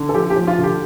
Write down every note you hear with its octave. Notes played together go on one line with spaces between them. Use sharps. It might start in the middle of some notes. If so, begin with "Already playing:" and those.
Already playing: D3
A4
F3 G4
G4
F3
F4
D3 G4